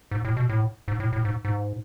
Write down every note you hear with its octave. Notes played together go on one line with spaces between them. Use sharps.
G#2
A2
B2
A2
G#2
A2
A2
G#2
G#2